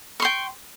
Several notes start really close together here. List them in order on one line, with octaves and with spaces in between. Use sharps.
C#6 C6 G5